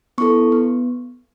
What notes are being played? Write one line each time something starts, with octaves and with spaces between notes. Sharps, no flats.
B3 E4 A4 C#6
B3